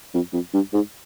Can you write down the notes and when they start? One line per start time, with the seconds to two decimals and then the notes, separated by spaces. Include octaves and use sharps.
0.14 F2
0.33 F2
0.54 G2
0.74 G#2